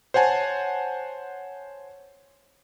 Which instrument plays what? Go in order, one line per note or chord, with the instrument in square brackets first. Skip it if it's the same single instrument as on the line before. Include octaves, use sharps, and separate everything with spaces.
[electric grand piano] C5 C#5 F#5 G#5 A5